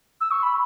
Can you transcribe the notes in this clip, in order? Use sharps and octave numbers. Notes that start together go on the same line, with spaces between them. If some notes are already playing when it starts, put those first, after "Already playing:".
E6
C#6
B5